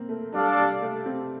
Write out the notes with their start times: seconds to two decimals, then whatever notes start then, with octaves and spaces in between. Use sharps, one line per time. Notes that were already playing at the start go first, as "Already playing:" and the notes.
Already playing: A#3 C4
0.09 A3
0.34 G3 D4 A4 D5 F5
0.58 G3
0.82 A3
1.06 C4